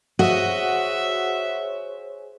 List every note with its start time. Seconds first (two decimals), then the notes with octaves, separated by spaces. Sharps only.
0.19 F#4 G#4 C5 C#5 D#5 E5